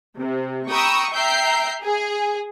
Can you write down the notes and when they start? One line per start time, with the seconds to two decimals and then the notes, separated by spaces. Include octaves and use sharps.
0.19 C3
0.71 G5 A#5 B5 C#6 D#6 E6
1.13 E5 G5 A#5 G6 C7
1.84 G#4